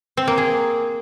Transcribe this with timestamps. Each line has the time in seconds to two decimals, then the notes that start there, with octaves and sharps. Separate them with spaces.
0.17 C4
0.28 A#3
0.38 G#4